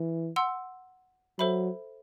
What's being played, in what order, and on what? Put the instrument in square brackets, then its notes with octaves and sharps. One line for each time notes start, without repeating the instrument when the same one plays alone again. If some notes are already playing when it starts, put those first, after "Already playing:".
Already playing: [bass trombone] E3
[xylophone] F#5 C6 E6
[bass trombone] F#3 [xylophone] A4 C5 E5 B5